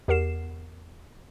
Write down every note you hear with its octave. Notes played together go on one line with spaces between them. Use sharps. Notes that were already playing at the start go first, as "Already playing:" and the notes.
E2 G4 A#4 F#5 C7 E7